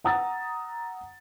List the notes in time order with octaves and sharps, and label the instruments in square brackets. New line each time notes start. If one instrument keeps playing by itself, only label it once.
[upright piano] F#5 A#5 D#6 E6 A6